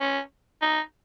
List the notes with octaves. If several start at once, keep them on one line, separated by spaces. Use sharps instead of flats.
C#4
D#4